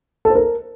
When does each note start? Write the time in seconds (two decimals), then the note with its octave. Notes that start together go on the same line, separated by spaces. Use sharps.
0.25 A4
0.30 C5
0.35 A#4